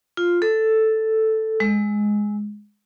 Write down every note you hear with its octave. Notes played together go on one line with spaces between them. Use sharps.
F4
A4
G#3